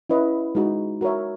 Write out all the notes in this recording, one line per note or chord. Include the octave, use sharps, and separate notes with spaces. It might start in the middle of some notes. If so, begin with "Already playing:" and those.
C#4 E4 B4 D#5
G#3 D#4 F#4
F#4 A#4 C#5 E5